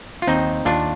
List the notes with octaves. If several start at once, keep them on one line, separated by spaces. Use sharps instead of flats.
F4
D#2 C4 D#4
D#2 D4 F4